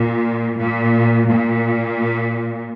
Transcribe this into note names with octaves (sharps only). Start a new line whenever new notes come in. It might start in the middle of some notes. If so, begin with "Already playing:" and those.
Already playing: A#2
A#2
A#2